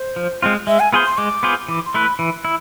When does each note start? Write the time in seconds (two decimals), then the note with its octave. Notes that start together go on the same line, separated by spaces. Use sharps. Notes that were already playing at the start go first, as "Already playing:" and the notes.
Already playing: C5
0.16 F3
0.42 G#3 C4 F4
0.67 G#3 E5
0.80 G#5
0.93 B3 F4 G#4 C5
1.05 C6
1.18 G#3 D6
1.43 B3 F4 G#4 C5
1.68 E3 D6
1.86 C6
1.94 A3 E4 B4
2.02 B5
2.19 E3 B5
2.45 E4